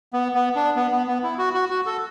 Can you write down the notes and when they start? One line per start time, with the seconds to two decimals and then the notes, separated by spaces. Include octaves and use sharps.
0.13 B3
0.34 B3
0.56 D4
0.76 B3
0.92 B3
1.07 B3
1.23 E4
1.38 F#4
1.54 F#4
1.70 F#4
1.86 A4